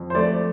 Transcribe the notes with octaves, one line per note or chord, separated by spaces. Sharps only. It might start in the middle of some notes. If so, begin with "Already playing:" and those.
Already playing: F2
C5
A3 D5